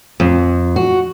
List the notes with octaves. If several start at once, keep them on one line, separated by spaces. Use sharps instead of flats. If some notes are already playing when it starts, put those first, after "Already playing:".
F2
F#4